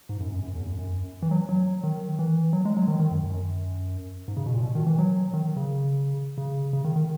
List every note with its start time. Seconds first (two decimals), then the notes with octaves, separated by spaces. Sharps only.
0.09 G#2
0.20 F#2
0.32 F#2
0.44 F#2
0.55 E2
0.67 F#2
0.79 F#2
1.22 E3
1.31 F#3
1.49 F#3
1.84 D#3
2.19 E3
2.53 F#3
2.65 G#3
2.77 F#3
2.88 D#3
3.00 D#3
3.12 F#2
3.23 F#2
4.28 G#2
4.37 C#3
4.46 B2
4.54 A#2
4.63 B2
4.75 D#3
4.87 E3
4.98 F#3
5.34 D#3
5.57 C#3
6.38 C#3
6.73 C#3
6.84 D#3
6.96 D#3